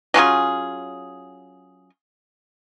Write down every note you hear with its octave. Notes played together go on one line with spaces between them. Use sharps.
F#3 C#4 F4 G#4